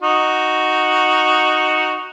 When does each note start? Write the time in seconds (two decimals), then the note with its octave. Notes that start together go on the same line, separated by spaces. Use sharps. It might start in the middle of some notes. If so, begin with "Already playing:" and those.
0.02 D#4 F#4